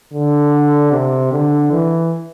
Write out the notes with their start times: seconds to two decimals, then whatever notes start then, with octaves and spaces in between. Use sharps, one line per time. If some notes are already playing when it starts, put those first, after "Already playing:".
0.14 D3
0.92 C3
1.32 D3
1.72 E3